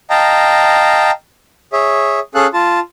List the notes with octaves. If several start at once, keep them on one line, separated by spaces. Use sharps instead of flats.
D#5 F5 G5 A5 A#5
G#4 C#5 E5
C#4 G#4 A4 F5 F#6
F4 A5